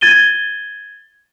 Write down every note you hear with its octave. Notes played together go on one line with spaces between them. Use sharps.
G#6 A6 D#7 G7